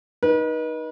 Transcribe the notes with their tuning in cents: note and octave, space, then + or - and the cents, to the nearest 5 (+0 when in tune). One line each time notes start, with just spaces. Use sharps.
D#4 +0 B4 -40